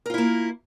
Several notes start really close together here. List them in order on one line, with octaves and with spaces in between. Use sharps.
A#4 F4 E4 A#3